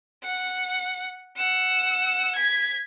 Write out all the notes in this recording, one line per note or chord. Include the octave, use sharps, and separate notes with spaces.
F#5
F#5 E6
G#6 B6